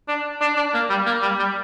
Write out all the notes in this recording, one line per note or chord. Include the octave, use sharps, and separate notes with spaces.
D4
D4
D4
A#3
G3
A#3
G3
G3